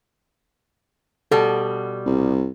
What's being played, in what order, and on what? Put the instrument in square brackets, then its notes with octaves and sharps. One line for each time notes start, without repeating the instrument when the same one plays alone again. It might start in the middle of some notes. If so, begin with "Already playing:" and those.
[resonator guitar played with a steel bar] B2 G3 [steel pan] A4
[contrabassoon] C2